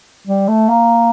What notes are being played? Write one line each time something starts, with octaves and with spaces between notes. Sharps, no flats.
G3
A3
A#3